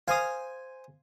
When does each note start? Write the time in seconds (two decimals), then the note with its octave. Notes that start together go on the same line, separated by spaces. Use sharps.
0.08 C5 F5 G#5 D#6